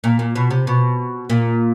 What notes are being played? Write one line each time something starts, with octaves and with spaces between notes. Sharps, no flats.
A#2
A#2
B2
C3
B2
A#2